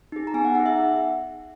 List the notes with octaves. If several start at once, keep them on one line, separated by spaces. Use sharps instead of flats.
D#4 G#4
A#5
B3 G#5
F#5
D#4 G#4 F#5
E5